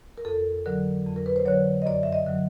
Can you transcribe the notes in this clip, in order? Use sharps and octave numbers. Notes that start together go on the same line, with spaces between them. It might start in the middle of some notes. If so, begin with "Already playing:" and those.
A#4
F2 A4
D3 F#3 A#4
F2
A#4
B4
C5
D3 F#3 C#5
D#5
F#2 D5
E5
D#5
D3 F#3